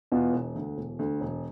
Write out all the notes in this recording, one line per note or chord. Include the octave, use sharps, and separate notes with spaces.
E2 B2 B3 F4
E1
D2 D3
E1
D2 D3
E1